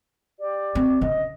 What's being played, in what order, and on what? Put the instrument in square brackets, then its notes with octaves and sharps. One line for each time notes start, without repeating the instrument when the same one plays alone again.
[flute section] G4 D5
[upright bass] C4
[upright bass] C#3 [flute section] D#5